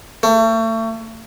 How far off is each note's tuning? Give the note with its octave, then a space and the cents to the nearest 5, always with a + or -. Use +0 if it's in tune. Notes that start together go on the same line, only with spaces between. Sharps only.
A3 +35